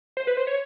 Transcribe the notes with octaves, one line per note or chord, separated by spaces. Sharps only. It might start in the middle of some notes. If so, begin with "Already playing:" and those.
C5
B4
C5
C#5